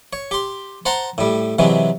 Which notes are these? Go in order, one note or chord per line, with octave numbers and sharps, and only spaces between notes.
C#5
G4 C6
C5 F#5 A5 A#5 C6
A2 G3
C3 E3 F#3 G#3